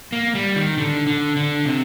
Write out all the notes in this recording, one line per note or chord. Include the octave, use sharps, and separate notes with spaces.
A#3
G3
D#3
D3
D3
D3
C3